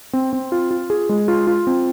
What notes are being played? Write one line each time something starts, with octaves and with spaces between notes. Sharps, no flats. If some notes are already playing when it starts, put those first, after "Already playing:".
C4
C4
F4
F4
G#4
G#3
F4
F4
C4